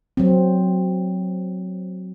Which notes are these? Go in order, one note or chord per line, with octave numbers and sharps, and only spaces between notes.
F#3 C4